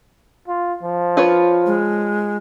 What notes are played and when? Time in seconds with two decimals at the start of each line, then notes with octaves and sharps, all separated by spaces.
0.48 F4
0.83 F3
1.17 F4 B4 C#5
1.66 G#3